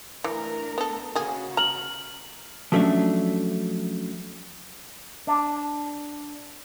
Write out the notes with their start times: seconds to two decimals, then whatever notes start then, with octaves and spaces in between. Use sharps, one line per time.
0.24 E3 A3 D4 A#4
0.78 B3 A4
1.15 C#3 A#3 F#4 G#4
1.57 A#5 F6 F#7
2.72 F3 F#3 A3 C#4 D4 E5
5.27 D4